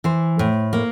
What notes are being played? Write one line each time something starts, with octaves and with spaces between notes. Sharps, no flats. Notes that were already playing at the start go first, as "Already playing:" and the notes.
E3 C5
A2
A#3